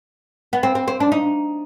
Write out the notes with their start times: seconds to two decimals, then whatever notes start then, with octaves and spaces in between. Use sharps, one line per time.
0.53 B3
0.63 C4
0.75 C4
0.88 C4
1.00 D4
1.12 D#4